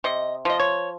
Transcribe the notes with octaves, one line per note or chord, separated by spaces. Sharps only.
C3 D#5
F3 D#5
C#5